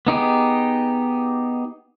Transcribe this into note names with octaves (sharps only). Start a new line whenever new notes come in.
B3 D#4 G4 G#4